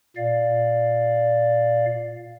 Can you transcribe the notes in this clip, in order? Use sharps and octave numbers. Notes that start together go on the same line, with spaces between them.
A#2 D5 F5